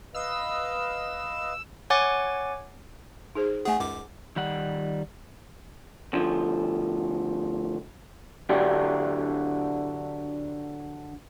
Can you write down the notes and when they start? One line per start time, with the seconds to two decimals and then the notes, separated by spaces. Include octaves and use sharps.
0.15 B4 D#5 F5 E6
1.90 C#5 F#5 G#5 D6 A6
3.35 D#4 G#4 C5
3.65 A3 G#4 F#5 G#5
3.80 C#2 F#2 D6
4.36 D#3 G3 F#5
6.13 D2 F3
8.49 D3 F#3 D4 G4